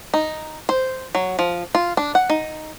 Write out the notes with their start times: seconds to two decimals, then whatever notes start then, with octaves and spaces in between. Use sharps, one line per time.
0.14 D#4
0.69 C5
1.15 F#3
1.39 F3
1.75 F4
1.97 D4
2.15 F#5
2.30 D#4